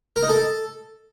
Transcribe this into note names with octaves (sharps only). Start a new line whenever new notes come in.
A#4
D#4
A4